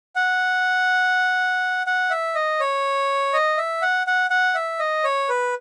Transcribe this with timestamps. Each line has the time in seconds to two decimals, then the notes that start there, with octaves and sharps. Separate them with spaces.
0.16 F#5
1.87 F#5
2.10 E5
2.35 D#5
2.60 C#5
3.33 D#5
3.57 E5
3.82 F#5
4.07 F#5
4.30 F#5
4.55 E5
4.79 D#5
5.04 C#5
5.29 B4